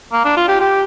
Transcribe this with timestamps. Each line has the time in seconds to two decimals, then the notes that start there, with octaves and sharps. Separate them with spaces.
0.13 A#3
0.25 D4
0.37 F4
0.48 G4
0.60 G4